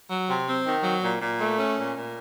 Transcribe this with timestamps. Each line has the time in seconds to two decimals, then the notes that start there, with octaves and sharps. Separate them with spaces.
0.09 F#3
0.27 C3
0.46 C4
0.64 D#3
0.83 F#3
1.01 A#2
1.19 A#2
1.38 A3
1.57 C#4
1.75 A#2
1.94 A#2